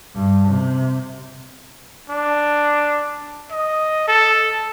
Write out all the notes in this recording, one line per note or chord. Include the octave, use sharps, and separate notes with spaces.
G2
C3
D4
D#5
A4